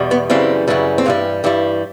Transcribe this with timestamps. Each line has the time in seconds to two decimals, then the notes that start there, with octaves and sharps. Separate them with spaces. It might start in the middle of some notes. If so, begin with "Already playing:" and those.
Already playing: E2 B2 G3
0.11 B3
0.30 F#2 C#3 E3 G3 C4
0.68 F#2 C#3 E3 G3
0.98 C4
1.06 G2 E3 G3 B3
1.44 G2 E3 G3